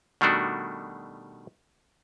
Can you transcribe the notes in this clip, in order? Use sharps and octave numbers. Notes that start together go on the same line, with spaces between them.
B2 D#3 G3 A3 D4 F#4